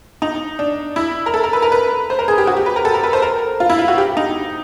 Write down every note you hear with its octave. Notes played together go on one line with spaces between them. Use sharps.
D#4
D4
E4
A#4
A4
A#4
B4
A#4
B4
C5
A#4
G#4
G4
F#4
G4
B4
A#4
A4
A#4
B4
C5
A#4
F4
E4
F4
F#4
G4
D#4